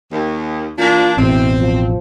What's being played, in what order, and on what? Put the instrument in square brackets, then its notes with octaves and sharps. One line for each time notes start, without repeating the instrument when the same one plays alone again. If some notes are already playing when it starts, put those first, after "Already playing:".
[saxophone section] D#2
[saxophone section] E3 A#3 D4 [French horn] F4
[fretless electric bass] A1 E2 B2 [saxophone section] C4 [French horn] E4
[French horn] F3